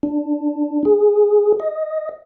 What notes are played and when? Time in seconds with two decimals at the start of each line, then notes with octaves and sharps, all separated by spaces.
0.03 D4
0.85 G#4
1.60 D#5